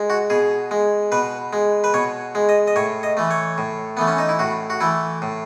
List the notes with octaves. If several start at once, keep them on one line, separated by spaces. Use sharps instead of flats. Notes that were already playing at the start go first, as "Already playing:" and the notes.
Already playing: G#3
F#4
B2 G#4
G#3
B2 B4
G#3
B4
B2 C#5
G#3
D#5
D#5
A2 C#5
D#5
E3 A3
C#5
A2
E3 A3 B3
C#4
D#4
E4
A2 F#4
F#4
E3 A3 E4
A2